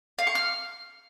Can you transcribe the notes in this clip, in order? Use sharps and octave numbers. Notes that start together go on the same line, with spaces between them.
F5
C#6
F6